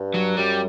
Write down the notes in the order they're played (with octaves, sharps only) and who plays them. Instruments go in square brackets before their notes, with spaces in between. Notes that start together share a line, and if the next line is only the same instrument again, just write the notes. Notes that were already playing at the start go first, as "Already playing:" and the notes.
Already playing: [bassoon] G2
[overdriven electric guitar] F#3
[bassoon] F#2 [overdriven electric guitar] G3